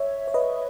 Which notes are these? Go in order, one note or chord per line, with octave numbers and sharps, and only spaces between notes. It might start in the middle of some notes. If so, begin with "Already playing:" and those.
Already playing: C#5 E5
C#5
B4 D#5